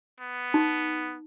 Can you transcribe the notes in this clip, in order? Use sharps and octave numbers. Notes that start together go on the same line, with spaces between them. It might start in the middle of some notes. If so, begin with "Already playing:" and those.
B3
D#4